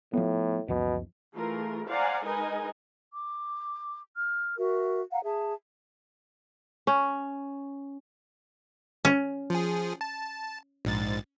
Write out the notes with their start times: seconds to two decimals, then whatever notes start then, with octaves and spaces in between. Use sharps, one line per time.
0.13 A2 F3 B3
0.68 C#2 F#2 B2 F3
1.34 E3 A3 F4 G#4 A#4
1.87 C5 D5 F5 F#5 G#5 A#5
2.24 G#3 D#4 A#4 B4 D#5 G#5
3.12 D6
4.15 F6
4.57 F#4 A#4 E5
5.11 F5 F#5 A#5
5.24 G#4 E5 A5
6.87 C#4
9.05 C#4
9.50 F3 G#4
10.01 A5
10.85 A#1 G#2 A6